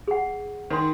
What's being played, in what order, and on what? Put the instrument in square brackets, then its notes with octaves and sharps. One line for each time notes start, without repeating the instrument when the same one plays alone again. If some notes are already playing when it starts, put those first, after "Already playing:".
[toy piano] G#4 F#5
[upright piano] D#3 [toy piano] C5 C6